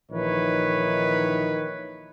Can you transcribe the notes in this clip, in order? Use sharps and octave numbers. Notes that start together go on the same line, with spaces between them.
A#1 D#3 E3 D#4 B4 C#5